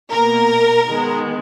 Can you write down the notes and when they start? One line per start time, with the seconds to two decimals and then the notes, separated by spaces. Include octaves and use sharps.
0.13 B2 A#3 A#4
0.88 D#3 G#3 B3